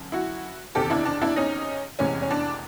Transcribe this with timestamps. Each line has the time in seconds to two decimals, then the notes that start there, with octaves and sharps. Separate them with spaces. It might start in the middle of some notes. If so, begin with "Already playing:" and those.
Already playing: F#2 D3
0.12 E4 F#4
0.75 F#1 E2 C3 D#3 G4 A4
0.90 D4 E4
1.05 D4
1.22 D4 E4
1.36 C#4 D#4
1.99 F1 E2 C3 E3 G#3 C#4
2.22 C#4
2.31 D4